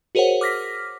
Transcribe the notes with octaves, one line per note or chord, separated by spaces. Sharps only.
F#4 G#4 A#4 C5 C#5 F#5
D6 F6 A#6 B6